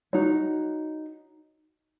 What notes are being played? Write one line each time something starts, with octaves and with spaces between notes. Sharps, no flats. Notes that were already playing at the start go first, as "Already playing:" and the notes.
D#4 F#4 C#5